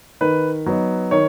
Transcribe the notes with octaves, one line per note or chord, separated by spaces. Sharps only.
D#3 B4
F#3 B3 D#4
D#3 C#5